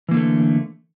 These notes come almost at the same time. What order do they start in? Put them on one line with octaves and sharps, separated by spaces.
E3 A#3 D3 A3